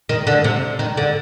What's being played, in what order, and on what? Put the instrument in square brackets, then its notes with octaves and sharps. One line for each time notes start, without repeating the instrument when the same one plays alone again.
[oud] D#3
D3
C3
D#3
D3